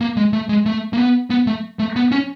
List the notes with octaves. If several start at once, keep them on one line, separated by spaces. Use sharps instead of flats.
A#3
G#3
A3
G#3
A3
A#3
B3
B3
A3
A3
B3
C#4